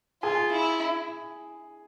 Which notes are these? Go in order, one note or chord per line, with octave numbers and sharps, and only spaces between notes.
F4 G#4 G#5
E4